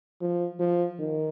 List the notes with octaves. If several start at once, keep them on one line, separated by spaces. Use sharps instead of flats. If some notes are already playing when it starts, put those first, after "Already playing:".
F3
F3
D#3